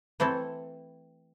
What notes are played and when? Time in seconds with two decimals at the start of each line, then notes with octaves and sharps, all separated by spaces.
0.20 E3 A3 C4 E4 A4